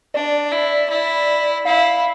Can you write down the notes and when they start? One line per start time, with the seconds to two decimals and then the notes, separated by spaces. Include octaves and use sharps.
0.14 D4 D5
0.52 E4
0.90 E4
1.65 E4 F5